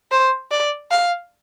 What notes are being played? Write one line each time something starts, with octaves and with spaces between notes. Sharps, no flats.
C5
D5
F5